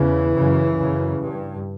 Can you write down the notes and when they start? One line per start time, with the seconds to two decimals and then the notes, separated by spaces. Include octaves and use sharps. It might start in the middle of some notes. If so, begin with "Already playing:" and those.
Already playing: E2 C#3 E3
0.34 F#2 C#3
0.77 F#2 C#3
1.21 G2